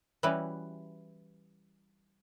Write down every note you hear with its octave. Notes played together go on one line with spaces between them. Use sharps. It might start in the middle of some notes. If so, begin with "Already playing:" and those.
E3 G3 C#4 E4 F#4 B4